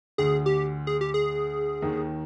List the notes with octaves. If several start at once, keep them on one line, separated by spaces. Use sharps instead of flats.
D2 D3 G#4
G4
G#4
G4
G#4
D#2 D#3